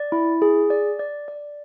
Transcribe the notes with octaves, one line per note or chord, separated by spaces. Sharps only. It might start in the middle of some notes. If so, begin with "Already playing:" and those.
Already playing: D5
E4
G#4
D5
D5
D5